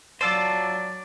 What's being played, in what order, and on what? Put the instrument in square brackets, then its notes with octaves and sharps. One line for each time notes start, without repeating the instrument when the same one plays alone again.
[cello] F#3 D5 [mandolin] D4 A5 E6 [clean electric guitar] F4 C5